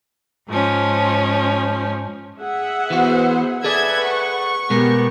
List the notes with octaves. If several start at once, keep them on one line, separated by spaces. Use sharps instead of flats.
G#2 F3 C#4
G#4 E5 F#5
E3 B3 F#4 C5
G#4 A4 B4 D5 E5 F#5 G#6
C#6
B2 G#3 B3 G4 A#4